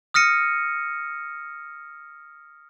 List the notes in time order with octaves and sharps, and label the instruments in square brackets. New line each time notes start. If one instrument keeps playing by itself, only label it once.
[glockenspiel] D#6 F6 A#6 C#7 D#7